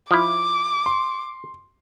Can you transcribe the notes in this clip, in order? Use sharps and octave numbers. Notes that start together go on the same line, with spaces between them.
F3 E4 D6
C6